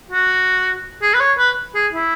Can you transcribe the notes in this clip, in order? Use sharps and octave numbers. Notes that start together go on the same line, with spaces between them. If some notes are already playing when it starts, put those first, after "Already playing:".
F#4
G#4
B4
C#5
B4
G#4
E4